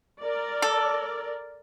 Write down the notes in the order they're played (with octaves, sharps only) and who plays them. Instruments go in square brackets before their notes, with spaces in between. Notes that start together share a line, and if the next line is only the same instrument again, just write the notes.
[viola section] A#4 D5
[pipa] A4